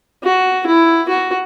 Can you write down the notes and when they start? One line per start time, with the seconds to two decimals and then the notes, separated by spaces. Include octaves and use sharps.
0.24 F#4
0.66 E4
1.09 F#4